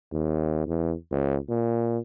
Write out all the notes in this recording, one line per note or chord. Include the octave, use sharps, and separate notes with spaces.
D#2
E2
C#2
A#2